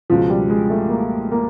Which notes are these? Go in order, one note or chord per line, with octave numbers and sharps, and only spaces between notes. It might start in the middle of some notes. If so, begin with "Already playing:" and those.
C#2 B2 F3
G3
G#3
A3
A#3
A#3